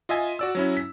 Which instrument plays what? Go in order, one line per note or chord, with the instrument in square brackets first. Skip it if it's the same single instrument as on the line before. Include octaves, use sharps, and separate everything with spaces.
[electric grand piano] F4 D#5 E5 G#5
F#4 D5 E6
F#3 C#4 E4
B6